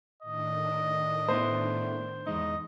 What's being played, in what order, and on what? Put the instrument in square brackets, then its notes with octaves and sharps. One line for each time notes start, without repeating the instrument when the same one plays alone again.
[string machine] A2 D#3 D4 [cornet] D#5
[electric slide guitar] A3 B3 E4 [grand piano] C5
[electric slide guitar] E2 G#3 D#4 [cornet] D#5